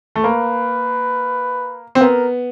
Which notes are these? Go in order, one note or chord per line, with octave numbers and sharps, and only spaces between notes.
A3
A#3 B4
C4
B3 A#4